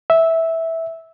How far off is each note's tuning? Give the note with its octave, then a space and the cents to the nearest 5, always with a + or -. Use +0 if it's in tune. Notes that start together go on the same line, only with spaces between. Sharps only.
E5 -10